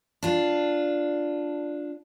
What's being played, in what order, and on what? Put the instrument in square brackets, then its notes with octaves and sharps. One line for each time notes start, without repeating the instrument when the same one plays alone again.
[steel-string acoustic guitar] D4 F4